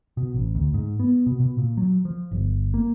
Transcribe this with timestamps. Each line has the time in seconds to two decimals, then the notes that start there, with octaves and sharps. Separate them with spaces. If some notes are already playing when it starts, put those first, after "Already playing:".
0.17 B2
0.34 A1
0.55 D2
0.74 G#2
1.00 B3
1.26 B2
1.40 B2
1.58 A#2
1.77 F#3
2.05 F3
2.31 G1
2.74 A#3